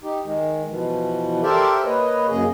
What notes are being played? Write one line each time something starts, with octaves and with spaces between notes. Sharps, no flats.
D#4 G4
D#3 G#3
B2 E3 F3
G4 A4 A#4 C5 D5 E5
A#3 B4 C#5 D#5
F#2 C#3 A#3 G#4 D#5